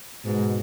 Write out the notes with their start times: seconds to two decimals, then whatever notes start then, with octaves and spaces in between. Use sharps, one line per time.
0.25 G#2 B2